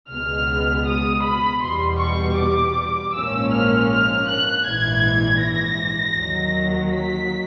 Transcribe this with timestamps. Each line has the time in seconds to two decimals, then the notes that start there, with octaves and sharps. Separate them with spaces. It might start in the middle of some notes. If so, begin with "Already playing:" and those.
0.11 C#2 B2 G#3 B3 F6
0.86 D#6
1.24 B5
1.63 E2 B2 G3 C6
2.00 C#6
2.38 D6
3.14 A#1 G#2 F3 A#3 C#4 E6
3.53 F6
3.90 F6
4.28 F#6
4.66 A#1 G#2 E3 G#6
5.41 A#6
6.18 D#2 D#3 F#3
6.93 B6